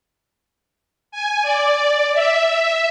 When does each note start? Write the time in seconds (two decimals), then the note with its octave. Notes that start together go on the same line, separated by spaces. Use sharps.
1.12 G#5
1.43 D5
2.13 E5